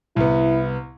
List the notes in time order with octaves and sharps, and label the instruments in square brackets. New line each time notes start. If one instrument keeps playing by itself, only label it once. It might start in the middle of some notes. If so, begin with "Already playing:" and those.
[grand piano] C2 B3 [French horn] E4